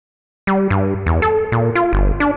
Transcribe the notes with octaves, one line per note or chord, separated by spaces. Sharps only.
G3
G2
E2
A4
A#2
F4
G1
D4